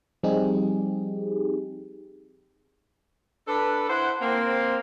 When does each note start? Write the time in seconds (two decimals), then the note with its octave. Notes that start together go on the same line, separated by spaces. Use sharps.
0.23 F3 G3 C4 D#4 G4 G#4
3.48 D4 A4 B4
3.89 E4 C5 F#5
4.21 A#3 C4